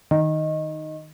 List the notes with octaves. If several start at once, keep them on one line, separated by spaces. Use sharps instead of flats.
D#3